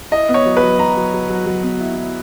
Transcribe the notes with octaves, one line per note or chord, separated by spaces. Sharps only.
E4 D#5
B3
C#5
F#3
B4
F#3
F#3 A#5
F#3
F#3
F#3
F#3
B3
E4
E4